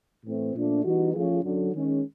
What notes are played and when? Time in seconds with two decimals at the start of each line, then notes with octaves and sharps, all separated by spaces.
0.24 A2 E3 A3 C4
0.54 A#2 F3 A3 D4
0.83 E3 G3 B3 D#4 F#4
1.13 F3 A3 C#4 F4 G#4
1.42 F#2 D3 F#3
1.72 D#3 G#3 C#4